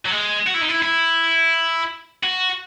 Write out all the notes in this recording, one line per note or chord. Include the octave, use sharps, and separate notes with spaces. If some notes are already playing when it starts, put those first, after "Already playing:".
F#3
G#3
F#4
E4
D#4
E4
E4
F#4